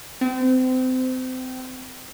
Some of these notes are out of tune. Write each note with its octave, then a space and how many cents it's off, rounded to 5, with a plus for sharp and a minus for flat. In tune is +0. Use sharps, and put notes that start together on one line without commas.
C4 -30